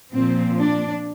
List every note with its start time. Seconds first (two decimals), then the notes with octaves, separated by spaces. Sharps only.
0.13 A#2 F3 C4
0.59 D4